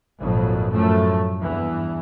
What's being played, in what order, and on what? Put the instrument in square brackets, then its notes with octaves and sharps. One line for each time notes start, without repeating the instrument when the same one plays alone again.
[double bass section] G#1 F2 A#2 F#3
F#2 A2 F3 A3
E2 G2 E3